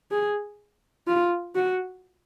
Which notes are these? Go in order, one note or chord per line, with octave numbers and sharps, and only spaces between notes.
G#4
F4
F#4